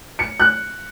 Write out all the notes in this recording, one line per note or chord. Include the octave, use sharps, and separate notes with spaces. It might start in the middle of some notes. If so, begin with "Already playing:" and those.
C#7
F#6